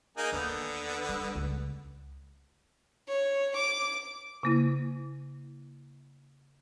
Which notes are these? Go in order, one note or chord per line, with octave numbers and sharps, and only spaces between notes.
A#3 D#4 G#4
D#2 D3 B3
G3
C#2
C#5
D6
C#3 A#3 E4